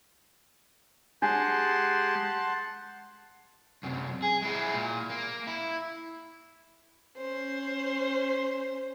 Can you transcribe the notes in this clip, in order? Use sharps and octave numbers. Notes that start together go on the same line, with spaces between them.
G#3 D4 G4 F#5 A5 C6
F#2 C3
G#4
G#3 E4
A#2
A#3
E4
C#4 C5